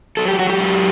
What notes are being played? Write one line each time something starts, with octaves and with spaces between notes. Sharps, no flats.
F#3 A4
G4
F#3 F#4
G4
F#2